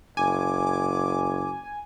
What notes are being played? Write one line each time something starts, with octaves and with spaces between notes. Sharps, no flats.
F#1 G#5 D6